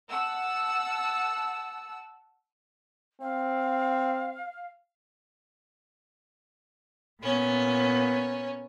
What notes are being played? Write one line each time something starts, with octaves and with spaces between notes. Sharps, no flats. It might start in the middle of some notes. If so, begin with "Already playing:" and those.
F#5 A5 E6
C4 F5
A#2 B3 C#4